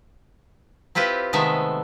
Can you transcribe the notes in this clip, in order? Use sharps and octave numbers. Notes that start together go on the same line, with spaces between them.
C4 E4 F4 G4 B4
C3 D#3 G#3 A3 B3 E5